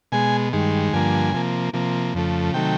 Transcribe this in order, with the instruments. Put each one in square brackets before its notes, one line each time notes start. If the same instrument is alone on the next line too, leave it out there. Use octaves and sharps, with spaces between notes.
[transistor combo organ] B2 G#3 G#5
G2 D#3 G#3
G2 D3 F3 A#3 G#5
C3 F3 A#3
C3 F3 A#3
F2 C#3 F3 A3
C3 D#3 F#3 A3 G5